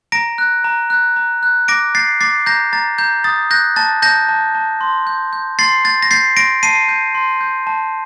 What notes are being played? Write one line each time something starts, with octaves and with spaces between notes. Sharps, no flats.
A#5 A#6 D7
F#6
A#5
F#6
A#5
F#6
D6 A#6 D7
G6 A6 C7
D6 A6 C7
A#5 G6 A#6
A#5 A6
A#5 G6
D#6 A6
F#6 G6 A#6
A5 A6
A5 G6 A#6
A5
A5
C6
G6
G6
C6 A6 C7
G6 A6
A#6
G6 A6 C7
C6 A#6 D7
A5 C7 D#7
G6
C6
G6
A5